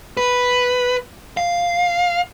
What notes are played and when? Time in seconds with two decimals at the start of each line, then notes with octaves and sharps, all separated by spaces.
0.17 B4
1.37 F5